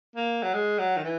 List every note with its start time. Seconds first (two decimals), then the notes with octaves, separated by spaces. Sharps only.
0.16 A#3
0.43 F#3
0.54 G#3
0.79 F#3
0.97 D#3
1.04 E3